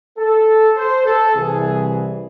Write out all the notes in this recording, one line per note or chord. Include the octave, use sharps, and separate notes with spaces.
A4
C5
A4
C2 C3 E3 G#4